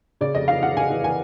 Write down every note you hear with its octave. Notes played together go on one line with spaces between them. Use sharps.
C#3 D5
F1 D#5
E3 F5
E3 F#5
C#3 G#5
E3
E3 G#5